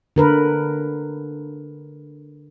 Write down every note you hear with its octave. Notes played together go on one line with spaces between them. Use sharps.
D3 A#4 B4